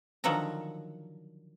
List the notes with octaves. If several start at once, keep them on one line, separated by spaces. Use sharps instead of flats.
D3 D#3 F3 F#3 F#5 A#5